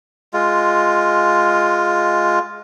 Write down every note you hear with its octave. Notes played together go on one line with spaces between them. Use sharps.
G#3 F4